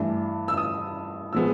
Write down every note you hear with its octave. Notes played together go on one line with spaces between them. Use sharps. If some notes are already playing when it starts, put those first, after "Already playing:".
Already playing: G2 E3 A3 D4
E6
D#6
A#2 F3 G#3 B3 E6